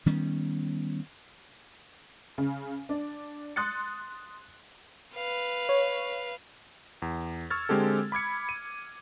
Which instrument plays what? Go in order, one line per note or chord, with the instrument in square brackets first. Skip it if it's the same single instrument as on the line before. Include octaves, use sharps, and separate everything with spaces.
[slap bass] D#3 G3 B3 C#4
[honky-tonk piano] C#3
D4
C6 D#6 F#6 A6 C#7
[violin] B4 F5
[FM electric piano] C#5
[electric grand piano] E2
C#6 E6 F6 G#6 A6
D3 G#3 C4 G4 A4
B5 D6 G#6 C#7
D#7